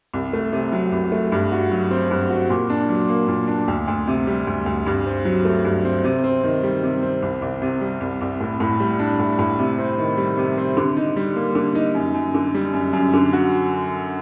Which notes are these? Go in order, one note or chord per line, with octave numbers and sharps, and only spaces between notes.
C2
A3
C3
F#3
C2
A3
G2
F#4
F#3
C4
G2
F#4
A#2
D4
F#3
A#3
A#2
D4
D2
D2
C3
G3
D2
D2
G2
C4
F#3
A3
G2
C4
C3
C4
D#3
G3
C3
C4
C2
C2
C3
G3
C2
C2
A2
A2
G3
D4
A2
A2
C3
C4
D#3
G3
C3
C4
D3
D#4
G3
A#3
D3
D#4
F#2
F#2
D3
G3
F#2
F#2
D3
F#4